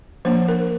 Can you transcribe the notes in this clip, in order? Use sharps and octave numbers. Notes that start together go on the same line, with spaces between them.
F3 A#3 D4 C5
A#4